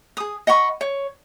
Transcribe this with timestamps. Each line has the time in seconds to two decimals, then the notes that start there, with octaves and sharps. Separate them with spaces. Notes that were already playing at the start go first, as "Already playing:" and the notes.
0.17 G#4 D#6
0.47 D#5 F#5 B5 C#6
0.81 C#5